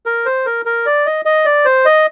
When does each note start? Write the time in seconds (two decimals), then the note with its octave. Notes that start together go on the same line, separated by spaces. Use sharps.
0.06 A#4
0.25 C5
0.46 A#4
0.66 A#4
0.86 D5
1.06 D#5
1.25 D#5
1.45 D5
1.65 C5
1.85 D#5